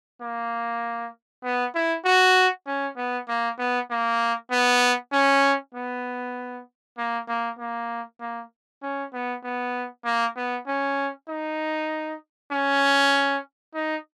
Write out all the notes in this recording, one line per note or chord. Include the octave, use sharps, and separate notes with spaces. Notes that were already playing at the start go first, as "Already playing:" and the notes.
A#3
B3
E4
F#4
C#4
B3
A#3
B3
A#3
B3
C#4
B3
A#3
A#3
A#3
A#3
C#4
B3
B3
A#3
B3
C#4
D#4
C#4
D#4